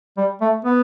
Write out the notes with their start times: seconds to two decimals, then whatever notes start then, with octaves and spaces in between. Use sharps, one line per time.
0.17 G3
0.41 A3
0.64 B3